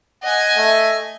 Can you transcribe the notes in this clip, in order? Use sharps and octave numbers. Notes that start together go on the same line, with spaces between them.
D#5 F#5 G#5
A3